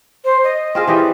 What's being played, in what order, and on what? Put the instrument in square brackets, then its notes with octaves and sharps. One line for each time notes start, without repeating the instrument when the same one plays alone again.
[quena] C5
D#5
[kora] C4 F4 G#4
E3 G4 D5